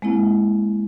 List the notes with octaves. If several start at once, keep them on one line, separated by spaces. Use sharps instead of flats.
G#3 A#3 C4 E4